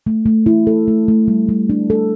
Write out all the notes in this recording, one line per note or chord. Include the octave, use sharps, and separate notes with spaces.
A3
A3
E4
A4
A3
A3
G3
G3
D4
A4